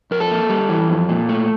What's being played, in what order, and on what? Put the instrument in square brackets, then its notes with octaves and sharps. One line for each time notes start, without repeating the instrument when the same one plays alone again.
[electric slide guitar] F2 A#4
A4
A#3
G3
E3
F2
A#2
A3